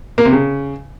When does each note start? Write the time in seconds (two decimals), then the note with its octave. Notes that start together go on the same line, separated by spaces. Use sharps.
0.18 A#3
0.25 C3
0.33 C#3